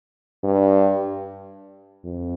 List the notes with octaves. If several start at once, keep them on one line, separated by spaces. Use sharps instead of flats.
G2
F2